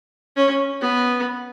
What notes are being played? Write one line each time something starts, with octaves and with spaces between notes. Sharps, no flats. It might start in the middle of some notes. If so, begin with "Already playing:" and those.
C#4
B3